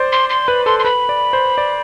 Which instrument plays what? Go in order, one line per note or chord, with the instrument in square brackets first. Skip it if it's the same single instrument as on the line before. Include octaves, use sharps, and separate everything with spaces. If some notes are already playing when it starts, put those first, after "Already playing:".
Already playing: [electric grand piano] C5 D5
[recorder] C6
C6
[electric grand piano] B4 [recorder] B5
[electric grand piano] A4 [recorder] C6
[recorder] C6
[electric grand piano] B4 [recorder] B5
[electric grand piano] D5
C5
D5